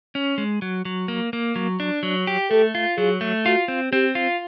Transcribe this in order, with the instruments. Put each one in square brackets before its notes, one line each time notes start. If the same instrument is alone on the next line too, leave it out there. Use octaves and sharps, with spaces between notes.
[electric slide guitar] C#4
G#3
F#3
F#3
A#3
A#3
F#3
D4
F#3
G4
[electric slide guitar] A3 [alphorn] A4
[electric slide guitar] F4
[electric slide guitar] F#3 [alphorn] G#4
[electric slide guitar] A3
[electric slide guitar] F4 [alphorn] F#4
[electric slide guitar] C4
[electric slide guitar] C4 [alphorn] G4
[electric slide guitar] F4